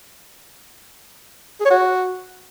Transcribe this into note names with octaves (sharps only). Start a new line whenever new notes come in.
G#4
C#5
F#4